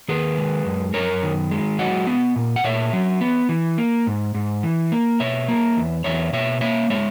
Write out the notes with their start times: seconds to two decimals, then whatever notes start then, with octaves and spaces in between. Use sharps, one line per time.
0.08 D#3 G#4 B4
0.37 G#3
0.66 F#2
0.94 F#2 A#4 C#5
1.23 D#3
1.51 G#3
1.79 F#3 D#5 F#5
2.07 B3
2.36 A#2
2.56 F#5
2.64 A#2 C#5 E5
2.93 F#3
3.21 B3
3.49 E3
3.78 A#3
4.07 G#2
4.35 G#2
4.63 E3
4.92 A#3
5.20 B2 C#5 E5
5.48 A#3
5.77 E2
6.04 E2 C#5 E5
6.33 B2 C#5 E5
6.61 A#3 C#5 E5
6.90 G#3 C#5 E5